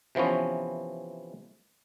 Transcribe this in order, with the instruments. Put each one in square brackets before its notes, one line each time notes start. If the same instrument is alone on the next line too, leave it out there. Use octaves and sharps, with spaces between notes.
[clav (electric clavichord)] C3 E3 F3 B3 C#4